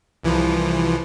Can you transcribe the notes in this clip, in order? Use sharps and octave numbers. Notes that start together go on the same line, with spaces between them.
C2 E3 F3